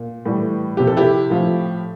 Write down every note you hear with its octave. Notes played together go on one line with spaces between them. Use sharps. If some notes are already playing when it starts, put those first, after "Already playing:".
Already playing: A#2
A2 E3 G3
C3 F3 G4
A4
E4 G4
A2 F3